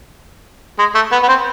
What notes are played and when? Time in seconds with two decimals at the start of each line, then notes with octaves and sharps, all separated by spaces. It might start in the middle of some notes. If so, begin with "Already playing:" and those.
0.79 G#3
0.95 A3
1.12 B3
1.23 B3
1.28 C4